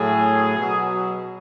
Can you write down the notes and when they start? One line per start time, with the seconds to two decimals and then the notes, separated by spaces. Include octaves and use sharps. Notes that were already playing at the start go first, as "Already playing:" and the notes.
Already playing: A2 F#3 G#4
0.57 B2 F#3